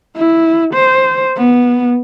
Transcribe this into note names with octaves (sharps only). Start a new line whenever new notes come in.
E4
C5
B3